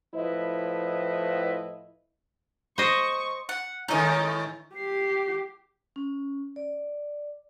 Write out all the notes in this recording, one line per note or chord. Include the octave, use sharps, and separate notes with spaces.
A2 F3 E4 B4 D#5
C5 D#5 C#6
F#5
A2 D#3 E3 G#3 C#4 D#4 D#5
G4 C7
C#4
D5